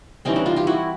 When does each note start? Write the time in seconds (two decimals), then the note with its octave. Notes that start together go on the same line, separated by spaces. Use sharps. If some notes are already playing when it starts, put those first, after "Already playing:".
0.25 E3 G3 C4 C#4 D#4
0.36 C4 D4
0.46 D#4 F4
0.56 F4 G4
0.67 E4 F#4